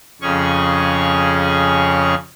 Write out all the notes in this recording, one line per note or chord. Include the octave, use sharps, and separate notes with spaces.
F2 C#3 C#4 G#4 C#6